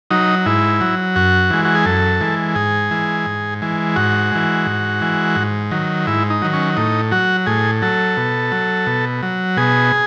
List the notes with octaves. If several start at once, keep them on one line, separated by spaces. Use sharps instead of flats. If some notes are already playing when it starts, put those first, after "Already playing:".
F#3 D#4
G#2 E4
F#3
F#2 F#4
E3 G#3
F#4
G#4
F#2 A4
E3 G#3
G#2 G#4
E3 G#3
G#2
E3 G#3
G#2 F#4
E3 G#3
G#2
E3 G#3
G#2
D#3 F#3
G#2 E4
D#4
D#3 F#3
C#4
A2 D#4
F#3 F#4
A2 G#4
F#3 A4
B2
F#3
B2
F#3
B2 G#4